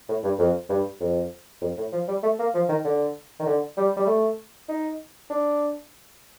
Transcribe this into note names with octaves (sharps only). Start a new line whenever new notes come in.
A2
G2
F2
G2
F2
F2
A2
F3
G3
A3
A#3
F3
D#3
D3
D#3
D3
G3
G3
A3
D#4
D4